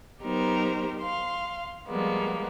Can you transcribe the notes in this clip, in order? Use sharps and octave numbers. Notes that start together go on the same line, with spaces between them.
F#3 B3 D#4 G4 A#4 C5
F5 C6
F3 G3 G#3 A#3 B3